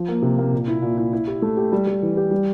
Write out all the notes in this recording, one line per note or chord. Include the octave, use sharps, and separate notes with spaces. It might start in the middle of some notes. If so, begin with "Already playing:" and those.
Already playing: F3
A#3
C3
A#3
A#2
E4
A#2
E4
E4
G4
A3
G4
G3
G3
E3
G4
G3